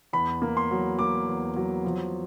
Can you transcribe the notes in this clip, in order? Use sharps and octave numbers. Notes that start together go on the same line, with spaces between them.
E2 B5
A#3
C6
F#3
A#3 D6
E2
F#3
F3